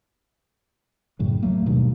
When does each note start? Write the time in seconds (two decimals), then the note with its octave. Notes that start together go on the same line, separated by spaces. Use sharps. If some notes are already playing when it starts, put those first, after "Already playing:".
1.19 F#2 A2 C#3 F#3
1.43 D#2 F#3 A3 A#3
1.66 G2 B2 D#3